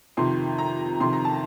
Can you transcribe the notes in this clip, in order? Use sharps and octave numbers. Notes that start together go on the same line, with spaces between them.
F2 C3 D#3 C6
A#5
F2 C3 D#3 C6
A#5
A5